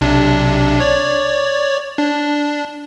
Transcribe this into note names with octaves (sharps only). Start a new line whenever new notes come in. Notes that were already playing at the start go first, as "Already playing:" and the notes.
B1 C3 D4
C#5 D5
D4